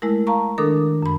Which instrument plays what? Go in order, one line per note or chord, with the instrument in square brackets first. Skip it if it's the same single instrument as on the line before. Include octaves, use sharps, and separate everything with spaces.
[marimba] G#3 A3 E4 A#4
F5 A5 A#5 C#6
D#3 D4 A4 A#4 D6 D#6
F#2 B5